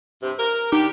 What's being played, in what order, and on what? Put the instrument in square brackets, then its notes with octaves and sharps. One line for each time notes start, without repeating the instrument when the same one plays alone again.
[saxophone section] G2 C3
A#4
[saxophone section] D3 G4 [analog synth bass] D#4